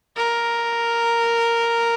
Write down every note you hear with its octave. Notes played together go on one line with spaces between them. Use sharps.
A#4